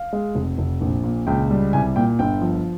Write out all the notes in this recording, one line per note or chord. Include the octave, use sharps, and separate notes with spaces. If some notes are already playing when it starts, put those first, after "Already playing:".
Already playing: F5
G#3
F1
F1
A#1
A#2
C#2 G5
G3
C2 G#5
A#2 G5
G1 G5
F3